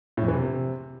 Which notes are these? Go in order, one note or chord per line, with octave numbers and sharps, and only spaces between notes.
A2
F2
E3
C3